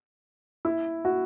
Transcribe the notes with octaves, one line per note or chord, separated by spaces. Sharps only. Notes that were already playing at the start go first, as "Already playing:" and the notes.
E4
F#4